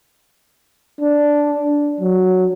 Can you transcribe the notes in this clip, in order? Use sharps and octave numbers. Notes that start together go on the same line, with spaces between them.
D4
F#3